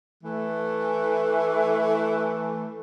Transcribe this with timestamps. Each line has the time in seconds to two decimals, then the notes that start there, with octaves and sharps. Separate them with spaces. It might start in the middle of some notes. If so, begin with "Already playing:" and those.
0.24 E3 A3